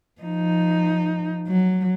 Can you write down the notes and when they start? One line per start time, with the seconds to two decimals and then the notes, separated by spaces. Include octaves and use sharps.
0.21 F3 D#4
1.47 F#3